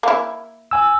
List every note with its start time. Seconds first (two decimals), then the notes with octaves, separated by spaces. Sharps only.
0.03 A#3 E4
0.71 G#5 E6